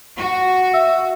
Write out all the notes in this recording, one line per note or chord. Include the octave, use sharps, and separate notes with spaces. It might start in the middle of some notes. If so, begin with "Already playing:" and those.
F#4
E5